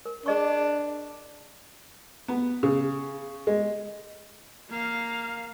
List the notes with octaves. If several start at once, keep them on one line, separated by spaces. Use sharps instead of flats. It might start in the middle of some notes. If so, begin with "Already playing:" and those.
A#4
D4 G#4 D#5 C#6
B3
C#3
G#3
A#3 F5